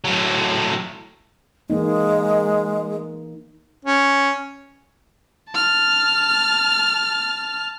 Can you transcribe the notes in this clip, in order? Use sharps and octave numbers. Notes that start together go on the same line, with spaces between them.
A2 F#3
E3 G#3 A#3 D#4
C#4
A5 F6